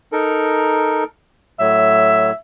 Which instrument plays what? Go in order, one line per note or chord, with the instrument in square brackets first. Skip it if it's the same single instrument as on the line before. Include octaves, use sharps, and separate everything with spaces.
[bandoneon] D#4 A4 A#4
[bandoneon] A2 F#3 [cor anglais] E5